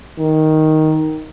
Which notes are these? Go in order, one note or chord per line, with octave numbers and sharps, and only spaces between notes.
D#3